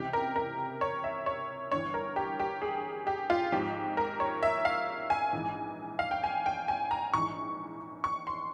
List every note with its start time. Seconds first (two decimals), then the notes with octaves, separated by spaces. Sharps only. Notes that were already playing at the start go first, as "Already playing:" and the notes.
Already playing: C#2 C3 E3 G4
0.13 A#4
0.36 A#4
0.81 C#5
1.04 E5
1.26 C#5
1.72 G1 G2 E3 C#5
1.94 A#4
2.16 G4
2.39 G4
2.62 G#4
3.07 G4
3.30 F4
3.52 G#1 G#2 F3 G4
3.97 A#4
4.20 C#5
4.43 E5
4.65 F5
5.10 G#5
5.33 A#1 G#2 E3
5.99 F5
6.11 G5
6.23 G#5
6.46 G5
6.68 G#5
6.91 A#5
7.14 A#1 G#2 E3 C#6
8.04 C#6
8.27 C6